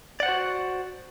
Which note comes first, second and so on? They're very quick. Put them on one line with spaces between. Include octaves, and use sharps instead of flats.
D5 F#5 C5 F#4